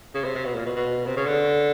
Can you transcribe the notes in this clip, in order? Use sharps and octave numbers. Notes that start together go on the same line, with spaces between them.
C#3
C3
C3
B2
A#2
B2
B2
C3
C#3
D3